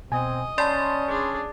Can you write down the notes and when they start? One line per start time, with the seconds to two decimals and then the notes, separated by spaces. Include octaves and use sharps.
0.12 B2 C4 D#5 G#5
0.58 C#4 D5 A5 B5 C6 A6
1.08 D4 G#4